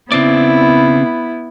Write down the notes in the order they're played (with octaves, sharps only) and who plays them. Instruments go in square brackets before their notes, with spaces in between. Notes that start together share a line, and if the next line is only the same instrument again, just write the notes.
[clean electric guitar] C#3 C4 D5 [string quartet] B3 E4